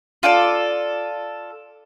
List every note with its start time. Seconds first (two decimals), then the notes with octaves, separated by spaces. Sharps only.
0.23 F4 A4 D5